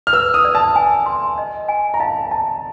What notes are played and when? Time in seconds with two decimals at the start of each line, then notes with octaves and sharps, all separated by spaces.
0.07 F6
0.13 B4 E6
0.34 D#6
0.45 D5
0.55 A5
0.76 G#5
1.06 C6
1.38 D#5
1.68 G#5
1.94 A#5
2.00 F5 A5
2.31 A5 A#5